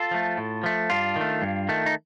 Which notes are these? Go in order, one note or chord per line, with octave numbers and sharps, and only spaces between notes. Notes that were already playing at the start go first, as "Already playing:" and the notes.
Already playing: F4 A4
F3 A3
A2
F3 A3
G2 D4 F4
D#3
A3
G2
D#3 A3
D#4